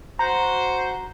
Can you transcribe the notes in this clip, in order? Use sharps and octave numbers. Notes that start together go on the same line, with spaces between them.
F#4 C5 A#5